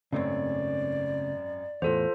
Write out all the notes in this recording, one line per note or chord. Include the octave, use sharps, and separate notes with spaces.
G#1 F#2 C#3 A3 C4 C#5 D5
E2 A2 F4 A4 C5